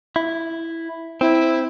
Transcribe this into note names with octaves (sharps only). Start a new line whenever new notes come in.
E4
C4 E4